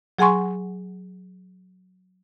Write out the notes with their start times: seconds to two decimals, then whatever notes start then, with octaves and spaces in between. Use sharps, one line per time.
0.19 F#3 G#4 F#5 G#5 C6 C#6